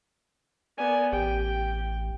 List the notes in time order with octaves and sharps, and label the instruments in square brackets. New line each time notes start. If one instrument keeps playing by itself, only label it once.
[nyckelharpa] B3 G#5 [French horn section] A#4 D5
[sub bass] A1 [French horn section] G4 [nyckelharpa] G5